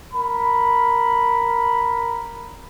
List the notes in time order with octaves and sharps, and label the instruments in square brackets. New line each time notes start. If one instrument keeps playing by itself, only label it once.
[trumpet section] A#4 B5